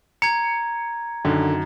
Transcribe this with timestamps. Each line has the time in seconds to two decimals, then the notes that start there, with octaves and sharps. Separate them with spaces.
0.22 A#5 G#6 C#7
1.25 F#2 D3 D#3